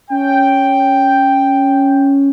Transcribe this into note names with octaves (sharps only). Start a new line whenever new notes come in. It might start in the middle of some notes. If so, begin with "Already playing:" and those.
C#4 G5